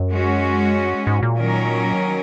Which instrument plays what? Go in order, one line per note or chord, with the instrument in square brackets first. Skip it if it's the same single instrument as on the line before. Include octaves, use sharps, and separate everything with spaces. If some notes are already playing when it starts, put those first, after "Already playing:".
Already playing: [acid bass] F#2
[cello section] G#3 C#4 F#4
[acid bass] G#2
A#2
[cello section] D#3 F#3 A#3 C#4 A#4